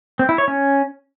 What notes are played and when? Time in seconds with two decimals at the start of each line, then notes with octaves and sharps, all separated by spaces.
0.19 C4
0.29 E4
0.38 C#5
0.48 C#4